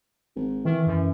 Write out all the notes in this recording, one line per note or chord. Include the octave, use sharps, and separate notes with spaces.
G#1
D#3 E3
F#2